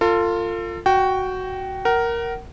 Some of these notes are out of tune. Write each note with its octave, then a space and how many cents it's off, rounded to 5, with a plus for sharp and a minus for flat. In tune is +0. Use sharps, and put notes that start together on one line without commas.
F4 +0 A4 +35
F#4 +5 G5 -15
A#4 +0 F#5 +35